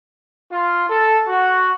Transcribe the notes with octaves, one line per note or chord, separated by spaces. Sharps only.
F4
A4
F#4